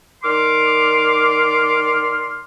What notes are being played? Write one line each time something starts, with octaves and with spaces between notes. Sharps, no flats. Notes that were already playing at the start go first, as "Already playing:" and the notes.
D#3 D5 C6 D6 F6